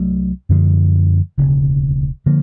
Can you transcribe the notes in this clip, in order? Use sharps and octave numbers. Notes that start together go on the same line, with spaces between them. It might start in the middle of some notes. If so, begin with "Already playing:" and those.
Already playing: C2 F#3 A3
F#2 D3 F3 G#3
E1 D2 C#3
D3 F3 A#3